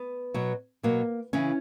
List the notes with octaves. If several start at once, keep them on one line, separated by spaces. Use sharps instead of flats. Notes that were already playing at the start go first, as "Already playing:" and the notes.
Already playing: B3
B2 F#3
B2 F#3 A#3
C#3 E3 C#4